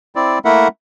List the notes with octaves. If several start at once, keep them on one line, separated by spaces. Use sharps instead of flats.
C4 E4 D5
A3 A#3 E4 A#4 E5 F#5